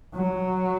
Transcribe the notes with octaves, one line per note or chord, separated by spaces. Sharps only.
F#3